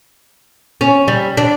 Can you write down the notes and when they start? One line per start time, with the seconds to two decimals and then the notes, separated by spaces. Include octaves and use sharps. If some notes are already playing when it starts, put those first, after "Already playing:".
0.81 C#4
1.08 G3
1.37 D4